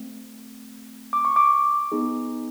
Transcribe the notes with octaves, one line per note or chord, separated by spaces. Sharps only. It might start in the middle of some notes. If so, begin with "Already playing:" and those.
Already playing: A3 C4
D6
C#6
D6
B3 D#4 G#4